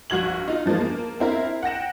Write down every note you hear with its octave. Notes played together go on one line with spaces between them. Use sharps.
A#1 F#4 G#6 F#7
D#4 F4
E3 F3 G#3 A#3
A#3
C4 E4 A#4
F#5 G5 A#6 E7